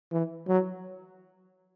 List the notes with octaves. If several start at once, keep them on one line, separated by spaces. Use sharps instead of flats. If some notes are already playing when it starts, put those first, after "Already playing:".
E3
F#3